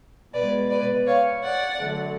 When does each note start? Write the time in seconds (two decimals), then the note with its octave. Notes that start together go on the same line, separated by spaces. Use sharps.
0.34 B2 G#3 B4 D5
0.70 B4 D5
1.06 C#5 F5
1.43 D5 F#5
1.80 D3 F#3 A3